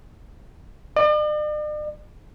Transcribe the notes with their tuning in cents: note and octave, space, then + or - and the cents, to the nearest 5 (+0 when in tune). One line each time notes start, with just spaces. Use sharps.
D5 +45